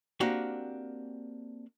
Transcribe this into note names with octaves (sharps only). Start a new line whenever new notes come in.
A#3 C4 D4 F#4 G4